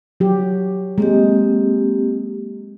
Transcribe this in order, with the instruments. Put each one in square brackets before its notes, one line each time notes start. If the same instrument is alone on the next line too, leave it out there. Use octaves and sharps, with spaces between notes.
[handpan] F#3 G4
[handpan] G#3 [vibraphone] A#3 C4 G4